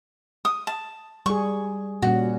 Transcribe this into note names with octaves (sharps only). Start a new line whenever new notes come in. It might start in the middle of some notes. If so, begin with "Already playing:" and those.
D#6
A5
G3 G#4 C#6
A#2 G3 C#4 F#4